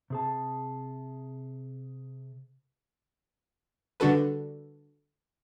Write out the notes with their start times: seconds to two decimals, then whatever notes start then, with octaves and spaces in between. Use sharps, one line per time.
0.10 C3 G#4 A5
4.00 D3 G3 D4 F#4 A4 B4